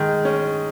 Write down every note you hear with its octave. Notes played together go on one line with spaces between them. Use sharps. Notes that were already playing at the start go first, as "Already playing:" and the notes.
Already playing: D#3 G#3
C#4